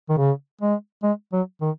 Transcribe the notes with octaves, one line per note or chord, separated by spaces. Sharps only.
D#3
C#3
G#3
G#3
F#3
D#3